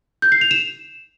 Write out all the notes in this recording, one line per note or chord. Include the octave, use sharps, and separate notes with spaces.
G6
C7
F7
E7